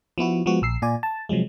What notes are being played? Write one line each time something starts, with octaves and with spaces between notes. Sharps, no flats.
F3 B3 E4 F#4
F3 G#3 B3 F#4
A#1 E6 C7
A#2 F4 D5 G#5
A5
C3 F3 F#3 G#3